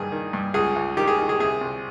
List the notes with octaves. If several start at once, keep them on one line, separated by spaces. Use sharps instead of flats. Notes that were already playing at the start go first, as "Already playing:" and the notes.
Already playing: G2 D#3 G#4
D#3
G2
C#2 G#4
C#2
D#3 G4
G#4
D#3
G#4
C3 G#4
C2